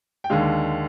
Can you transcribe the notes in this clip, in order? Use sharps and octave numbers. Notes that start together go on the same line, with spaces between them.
G5
D#2 D3 G#3 F5